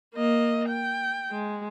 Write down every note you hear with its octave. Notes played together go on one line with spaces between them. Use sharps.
A#3 D#5
G5
G#3